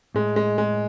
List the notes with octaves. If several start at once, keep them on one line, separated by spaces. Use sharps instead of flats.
A2 G#3
G#3
G#3